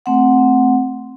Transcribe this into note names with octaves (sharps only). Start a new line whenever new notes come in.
A3 C4 F#5